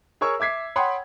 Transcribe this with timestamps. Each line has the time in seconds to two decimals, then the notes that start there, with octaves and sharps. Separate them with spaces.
0.21 G#4 A#4 C#5 C#6 E6
0.40 E5 D6 G#6 B6 C7
0.76 C#5 F#5 G5 B5 C6 D#6